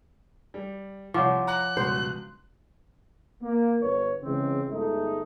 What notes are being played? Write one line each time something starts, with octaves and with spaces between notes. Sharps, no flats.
G3
C2 F3 C#5 F#5 C#6 D6
A#5 F#6
C#2 G2 B2 C5
A#3
G1 B4 C#5
C#3 E3 G#3 C4
G1 G#3 A3 D#4